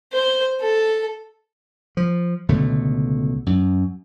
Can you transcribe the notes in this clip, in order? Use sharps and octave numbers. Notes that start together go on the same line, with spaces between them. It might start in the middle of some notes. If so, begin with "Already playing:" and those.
C5
A4
F3
C#2 B2 D3 A3
F#2